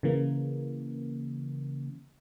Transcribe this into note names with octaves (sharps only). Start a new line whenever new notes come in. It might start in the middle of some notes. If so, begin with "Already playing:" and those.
C#3 E3 A#3